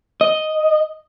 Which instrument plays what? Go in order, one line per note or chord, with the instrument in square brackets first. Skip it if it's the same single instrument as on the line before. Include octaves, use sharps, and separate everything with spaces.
[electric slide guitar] D#5